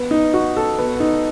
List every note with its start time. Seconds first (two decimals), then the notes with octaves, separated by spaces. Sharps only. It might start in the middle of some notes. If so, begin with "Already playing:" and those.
Already playing: B3
0.11 D#4
0.34 F#4
0.57 A4
0.79 B3
1.00 D#4